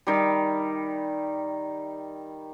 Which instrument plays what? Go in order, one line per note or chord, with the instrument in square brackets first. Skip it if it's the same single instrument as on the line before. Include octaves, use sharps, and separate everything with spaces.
[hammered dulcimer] D#3 G3